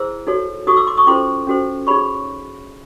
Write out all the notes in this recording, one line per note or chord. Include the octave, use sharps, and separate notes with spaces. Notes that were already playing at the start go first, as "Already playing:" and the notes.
Already playing: E4 G#4 C5 E6
D#4 F#4 A4 C#5
D#4 F#4 A4 C#6 D#6
D6 E6
C6 D6
C#6 D#6
C#4 F4 A4 C5 C6 D6
C#4 F#4 A4 C5
D#4 G#4 C#5 B5 C#6